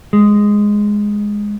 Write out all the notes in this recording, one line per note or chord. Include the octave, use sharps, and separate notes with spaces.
G#3